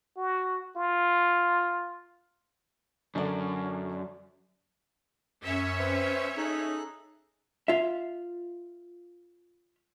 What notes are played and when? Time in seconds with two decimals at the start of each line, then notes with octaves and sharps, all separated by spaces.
0.17 F#4
0.76 F4
3.15 F#2 D3 D5
5.44 F#2 C#4 C#5 E5
5.79 C4 B4 C5
6.37 D#4 G#4 A4 F#6
7.68 F4 E5